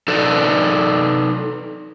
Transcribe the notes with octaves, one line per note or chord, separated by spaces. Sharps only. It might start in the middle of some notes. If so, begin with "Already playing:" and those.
D#4 A4 B4 D5